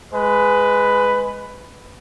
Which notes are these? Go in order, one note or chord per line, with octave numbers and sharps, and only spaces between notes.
G#3 B4